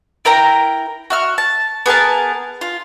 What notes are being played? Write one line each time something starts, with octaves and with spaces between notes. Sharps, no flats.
E4 A#4 G5 A#5
F#4 E5 F6
A5
B3 G#4 A#4 A5
F4